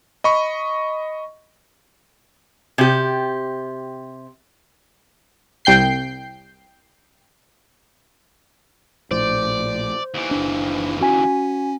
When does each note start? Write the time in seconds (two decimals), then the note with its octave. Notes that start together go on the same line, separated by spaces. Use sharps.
0.24 D#5 B5 C#6
2.78 C3 G4
5.65 C2 G5 G6 C7
9.11 A#1 A2 C5 D5
10.14 D#2 E3
10.31 F#1 D4
11.01 C#4 F#4 G#5 B6